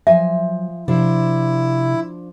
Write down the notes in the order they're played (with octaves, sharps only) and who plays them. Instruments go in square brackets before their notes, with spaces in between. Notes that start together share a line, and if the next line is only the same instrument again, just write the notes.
[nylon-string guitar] F3 G#5 [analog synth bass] F#3 [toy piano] E5
[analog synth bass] C3 [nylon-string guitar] F3 D4 [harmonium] E4